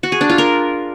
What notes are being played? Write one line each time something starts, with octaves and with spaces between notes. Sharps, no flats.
F#4
G#4
D4
F4
A#4